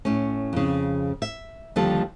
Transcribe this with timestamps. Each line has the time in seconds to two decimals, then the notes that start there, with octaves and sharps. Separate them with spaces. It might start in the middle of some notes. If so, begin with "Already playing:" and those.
0.05 A2 C#4
0.53 F2 C#3
1.22 E5
1.76 D#2 D3 F3 G3 F4 A4